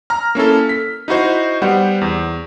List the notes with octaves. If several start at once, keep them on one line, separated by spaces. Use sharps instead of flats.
A#5 F6
A#3 C#4 E4 A4
B6
D#4 E4 F#4 C5
G3 B3 C5 F#5
E2